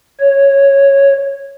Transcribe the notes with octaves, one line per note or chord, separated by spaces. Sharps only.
C#5